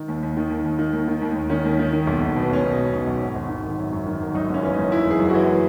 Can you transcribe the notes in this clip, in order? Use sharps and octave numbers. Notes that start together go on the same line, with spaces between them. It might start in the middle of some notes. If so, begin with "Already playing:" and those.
Already playing: D#3
D#2
D#2
D#3
D#2
D#2
D#3
D#2
D#3
D#2
D#2
D#3 C#4
D#2
D#3
D#3
B1
B1
B2
B3
B1 C#4
B2 D#4
B2
B1
B1
G#1
G#1
D#3
G#1
F#2
F#2
D#3
G#1
F#2 D#4
F#1 C#4
E3 C#4
D#4
F#1
E3 E4
F#1 G#4
F#2
F#4
E3